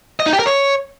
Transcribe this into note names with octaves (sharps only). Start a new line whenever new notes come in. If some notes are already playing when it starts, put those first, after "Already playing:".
D#5
D#4
G4
A#4
C#5